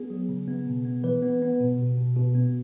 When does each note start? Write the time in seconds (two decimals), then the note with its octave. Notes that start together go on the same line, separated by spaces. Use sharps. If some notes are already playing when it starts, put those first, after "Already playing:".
Already playing: B3 G#4
0.10 F#3
0.29 C#3
0.48 B3
0.66 B2
0.85 B3
1.04 E3 B4
1.22 B3
1.42 B3
1.60 B2
1.79 B2
1.98 B2
2.16 B2
2.35 B3